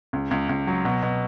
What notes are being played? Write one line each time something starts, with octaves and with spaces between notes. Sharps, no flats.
C#2
C#2
C#2
F#3
B2
B2